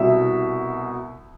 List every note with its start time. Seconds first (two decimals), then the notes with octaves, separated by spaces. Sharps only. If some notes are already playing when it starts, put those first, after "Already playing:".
Already playing: C2 B2 E5